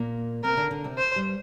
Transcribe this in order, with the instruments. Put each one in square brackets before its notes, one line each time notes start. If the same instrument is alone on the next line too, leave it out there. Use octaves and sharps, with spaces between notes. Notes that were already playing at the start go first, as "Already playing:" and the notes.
Already playing: [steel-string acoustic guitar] A#2 A#3
[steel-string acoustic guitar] C3 C4 [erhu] A#4
[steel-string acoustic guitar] D3 D4
D3 D4
C3 C4
[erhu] C5
[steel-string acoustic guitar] G2 G3